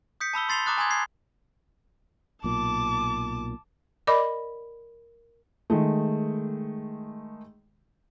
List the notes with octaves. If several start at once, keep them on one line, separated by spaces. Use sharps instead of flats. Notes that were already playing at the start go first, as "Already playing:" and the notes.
D#6 G6 B6 C#7
A5 B5 E6 G7
C6 A6 C7 F7 G7
A#5 D6 D#6 F#6 A6
G#5 A#5 C6 D#6 G#6
G#6 C7
B1 A#2 A5 D6
A#4 D5 D#5 B5 D6
D#3 G#3 A3